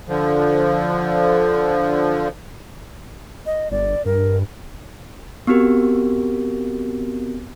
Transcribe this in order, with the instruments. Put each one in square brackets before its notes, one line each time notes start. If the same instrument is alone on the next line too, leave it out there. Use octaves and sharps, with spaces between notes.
[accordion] D3 F3
[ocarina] D#5
[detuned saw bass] G1 [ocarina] D5
[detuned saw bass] G2 [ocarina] A#4
[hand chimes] B3 C4 F#4 G4 A#4